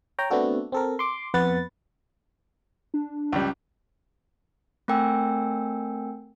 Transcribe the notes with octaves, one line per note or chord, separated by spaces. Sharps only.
C#5 G5 A#5
A3 B3 C4 D4 F#4 A4
C4 A4 A#4
C6 D6
F2 B3 B4 F#5 A6
D4
C#2 G3
A3 C4 A#4 G5 G#5 E6